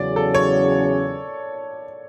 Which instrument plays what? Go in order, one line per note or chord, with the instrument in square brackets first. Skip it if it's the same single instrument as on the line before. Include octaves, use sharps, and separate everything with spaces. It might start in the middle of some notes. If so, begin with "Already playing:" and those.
Already playing: [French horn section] E2 C#3 F#3 C#4 [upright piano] D5
[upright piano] A4
C#5